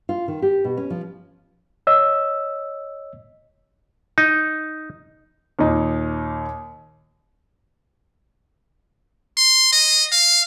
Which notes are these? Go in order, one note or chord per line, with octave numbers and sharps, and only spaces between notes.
F4
D#3
G4
B2
C#4
F3
C#5 D#5 E6
D#4
D#2 A#2 D#4
C6
D#5
F5